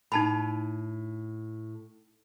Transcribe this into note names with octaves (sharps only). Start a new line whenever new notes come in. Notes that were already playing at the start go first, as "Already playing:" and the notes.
A2 D#4 A5 B5